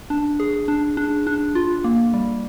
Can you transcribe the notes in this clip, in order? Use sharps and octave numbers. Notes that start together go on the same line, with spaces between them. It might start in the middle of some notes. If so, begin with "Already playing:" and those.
D4
G#4
D4
D4
D4
F4
A#3
G3